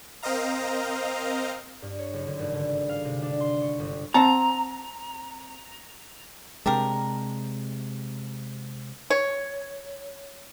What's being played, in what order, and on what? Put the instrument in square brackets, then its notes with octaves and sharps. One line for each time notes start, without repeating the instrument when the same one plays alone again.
[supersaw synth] C4 A#4 C5 D#5 F5 A#5
[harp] G2
C#5
F#1
D3
G#1
D3
F5
C3
D4
C6
C#6
G1
[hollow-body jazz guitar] C4 F#5 A5 [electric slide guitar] A#5
[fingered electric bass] C3 G#3 [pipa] D4 G4 A#4
[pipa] C#5